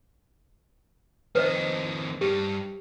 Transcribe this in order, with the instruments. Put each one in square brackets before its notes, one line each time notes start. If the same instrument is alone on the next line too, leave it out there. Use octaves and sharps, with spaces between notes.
[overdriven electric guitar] F2 D#3 [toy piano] B4 C5 D#5
[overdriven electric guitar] G2 [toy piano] G4